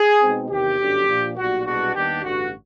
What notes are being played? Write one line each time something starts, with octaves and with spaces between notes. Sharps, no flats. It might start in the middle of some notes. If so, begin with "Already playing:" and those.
Already playing: G#4
B2 G#3 C4 D#4
E2 C3 D#3 G4
G1 F#2 D3 F#3
A#2 F3 A#3 D4
B1 A#2 G3 F#4
C2 B2 G#3 B3 D4 F#4
D#2 D#3 G3 B3 D4 G4
A1 G2 D3 F#4